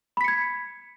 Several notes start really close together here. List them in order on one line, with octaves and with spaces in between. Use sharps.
B5 B6 C#7 G#6